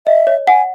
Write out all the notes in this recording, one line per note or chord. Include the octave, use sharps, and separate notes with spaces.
D#5 E5
C#5
F#5 G#5